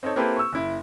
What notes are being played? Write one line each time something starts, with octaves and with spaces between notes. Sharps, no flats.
C4 D#4 A4 C#5
A#3 C4 E4 G4 A4 B4
C#6 E6
F#1 E4